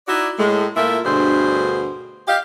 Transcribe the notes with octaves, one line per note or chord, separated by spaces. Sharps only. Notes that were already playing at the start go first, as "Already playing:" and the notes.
D#4 E4 F#4 D5
A2 G#3
A#2 A3 E4 F4 A#4 E5
D2 G2 B2 D3 G#4 C5
G4 D#5 F5